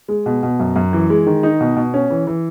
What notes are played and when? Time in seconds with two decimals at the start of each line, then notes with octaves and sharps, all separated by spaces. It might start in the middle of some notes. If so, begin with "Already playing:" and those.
0.08 G#3
0.26 B2
0.43 B2
0.59 F#2
0.76 F#2
0.93 E3
1.10 G#3
1.27 D#3
1.43 D#4
1.61 B2
1.76 B2
1.94 C#4
2.10 E3
2.27 E3